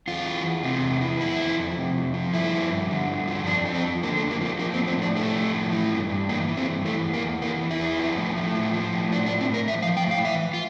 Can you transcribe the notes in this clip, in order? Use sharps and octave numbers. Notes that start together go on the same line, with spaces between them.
E2 F4
E3
E2
C3
E2
E3
F2 E4
F3
F2
C3
F2
F3
G2 E4
F3
G2
D3
G2
F3
F2 D4
F3
C4
F2
D3 A#3
A3
F2
A#3
F3 A#3
F3 A#3
C4
A2
C4
A2 D4
F3 A3
F3
A2
E3
G2
G2
E3 A#3
E3
C4
G2
E3 A3
E2
A#3
E2
E3 A#3
E3
E4
E2
F3
A2
A2
F3
F3
A2
F3 D4
D4
A2
C4
A2 A#4
F3 E5
F5
F3
G5
A2 F5
E3 E5
F4